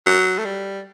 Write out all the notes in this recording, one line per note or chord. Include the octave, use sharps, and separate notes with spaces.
F#3
A3
G3